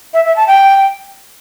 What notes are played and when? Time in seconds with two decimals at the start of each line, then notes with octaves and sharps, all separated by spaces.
0.14 E5
0.25 E5
0.36 A5
0.48 G5